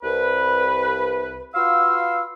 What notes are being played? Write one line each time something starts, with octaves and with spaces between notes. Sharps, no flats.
C2 B4
F4 F#4 B4 F5 C6 E6